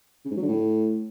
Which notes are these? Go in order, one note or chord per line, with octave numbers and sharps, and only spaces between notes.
C#3
G#2
F#3
D3
A2